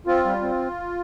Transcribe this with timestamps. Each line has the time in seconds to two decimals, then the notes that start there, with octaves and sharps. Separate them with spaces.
0.06 C4 F4
0.25 G3
0.42 C4